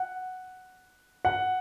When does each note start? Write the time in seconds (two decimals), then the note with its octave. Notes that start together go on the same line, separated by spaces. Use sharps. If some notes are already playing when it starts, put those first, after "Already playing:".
Already playing: F#5
1.25 F#5